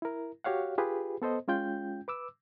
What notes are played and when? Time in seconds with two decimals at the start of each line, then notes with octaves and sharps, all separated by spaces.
0.02 E4 A#4
0.44 F#4 G4 C#5 F5 F#5
0.78 F4 G4 G#4 B4
1.22 B3 A4 C5 D#5
1.48 G#3 C#4 F4 G5 G6
2.08 B4 D6 E6